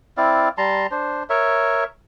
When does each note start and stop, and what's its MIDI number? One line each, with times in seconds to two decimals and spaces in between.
0.17 0.49 60
0.17 0.49 64
0.17 0.49 74
0.17 0.49 77
0.58 0.87 55
0.58 0.87 81
0.58 0.87 82
0.58 0.87 84
0.91 1.23 62
0.91 1.23 72
1.30 1.84 70
1.30 1.84 73
1.30 1.84 76